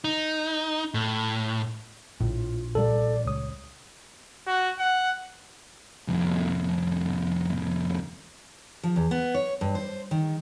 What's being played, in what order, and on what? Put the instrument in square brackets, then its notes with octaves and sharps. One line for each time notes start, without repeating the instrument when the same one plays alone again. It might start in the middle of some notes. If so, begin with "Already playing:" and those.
[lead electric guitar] D#4
A2
[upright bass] A#1 [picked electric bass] A2 [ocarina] F4
[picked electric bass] C2 A#2 G3 [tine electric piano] A4 [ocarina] D5
[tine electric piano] C#2 D#6 [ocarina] C#5
[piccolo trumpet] F#4
F#5
[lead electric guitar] C2 F2
[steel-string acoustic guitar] F3
E2
B3
C#5
G2
C5
D#3